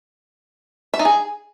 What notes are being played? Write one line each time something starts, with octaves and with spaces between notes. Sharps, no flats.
E5
D#4
G#4